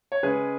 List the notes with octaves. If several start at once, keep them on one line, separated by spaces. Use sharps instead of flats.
C#5
C#3 G#3 G#4 B4